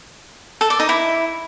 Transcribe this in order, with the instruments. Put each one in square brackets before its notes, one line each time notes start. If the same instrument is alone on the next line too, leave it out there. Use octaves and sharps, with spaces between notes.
[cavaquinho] A4
D5
D#4
E4